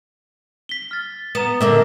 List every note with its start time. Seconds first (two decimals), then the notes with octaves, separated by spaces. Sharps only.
0.69 B6 G7
0.91 F6 A6
1.35 B3 A#5 E7
1.61 D3 A#3 E5